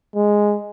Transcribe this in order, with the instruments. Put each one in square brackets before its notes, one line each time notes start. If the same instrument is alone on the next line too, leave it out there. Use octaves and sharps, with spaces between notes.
[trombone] G#3